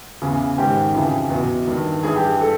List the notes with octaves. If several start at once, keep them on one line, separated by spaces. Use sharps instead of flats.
E2 C#3 E3
G#2 D#3 G4
F2 C#3 E3
E2 B2
G2 D#3
G2 E3 G#4
G4
A4